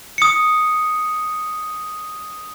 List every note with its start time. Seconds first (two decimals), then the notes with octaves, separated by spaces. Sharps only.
0.18 D#6 C#7